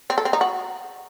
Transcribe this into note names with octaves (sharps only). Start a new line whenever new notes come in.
C4
A4
C4
D#4
F#4